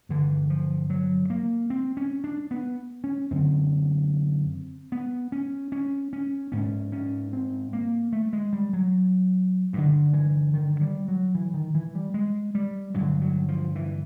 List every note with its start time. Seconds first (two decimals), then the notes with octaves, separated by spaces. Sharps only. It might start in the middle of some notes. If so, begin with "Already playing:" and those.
0.09 G2 D3 E3
0.50 F3
0.90 F#3
1.30 A#3
1.70 C4
1.97 C#4
2.24 D4
2.51 B3
3.04 C#4
3.31 F#2 D3 C4
4.92 B3
5.32 C#4
5.72 C#4
6.13 C#4
6.52 G#2 C#4
6.92 C#4
7.33 C4
7.73 A#3
8.13 A3
8.33 G#3
8.53 G3
8.73 F#3
9.73 G2 D3
10.13 E3
10.54 D#3
10.81 G3
11.08 F#3
11.35 E3
11.54 D#3
11.75 E3
11.95 G3
12.14 G#3
12.55 G3
12.94 G2 D3 F#3
13.22 F#3
13.48 F3
13.75 E3